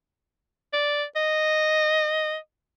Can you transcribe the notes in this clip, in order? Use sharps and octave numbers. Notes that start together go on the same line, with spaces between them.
D5
D#5